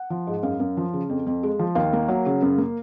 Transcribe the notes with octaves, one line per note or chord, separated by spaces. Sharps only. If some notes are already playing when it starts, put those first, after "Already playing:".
Already playing: F#5
F3
G#2
F#2 F5
F#2
F3
C#3
F2
F2
G#3
F3
D#2 F5
A#3
F#3
C#3
F#2
A#3